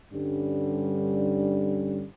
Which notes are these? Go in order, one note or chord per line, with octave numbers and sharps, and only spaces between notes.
G2 D3 G3 C#4